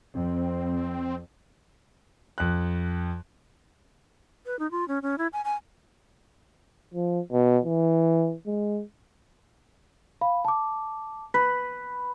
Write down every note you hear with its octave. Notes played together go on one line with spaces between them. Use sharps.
F2 C4
F2 F#6
B4
D#4
F4
C#4
C#4
E4
G#5
G#5
F3
B2
E3
G#3
F5 B5
A5 D6
B4 B6